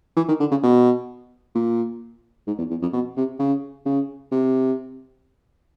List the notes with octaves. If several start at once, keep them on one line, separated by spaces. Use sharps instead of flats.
E3
D#3
D3
C#3
B2
A#2
G#2
E2
E2
F2
B2
C3
C#3
C#3
C3